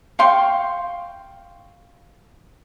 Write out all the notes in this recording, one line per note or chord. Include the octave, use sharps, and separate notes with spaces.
F5 G5 C6 C#6